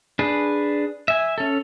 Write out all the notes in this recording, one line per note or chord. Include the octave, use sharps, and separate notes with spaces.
D4 G#4 B4
E5 G#5
C#4 A4